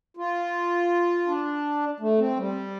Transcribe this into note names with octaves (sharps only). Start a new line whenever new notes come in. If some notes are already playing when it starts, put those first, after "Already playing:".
F4
D4
A3
C4
G3